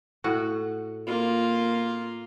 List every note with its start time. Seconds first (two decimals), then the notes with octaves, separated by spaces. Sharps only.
0.24 A2 F#4
1.07 A#3 F4